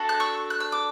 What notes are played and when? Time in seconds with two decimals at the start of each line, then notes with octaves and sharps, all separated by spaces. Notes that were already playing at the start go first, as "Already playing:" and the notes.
Already playing: D4 F#4 A4
0.09 F#6
0.20 C#6 E6
0.50 F#6
0.60 E6
0.72 D6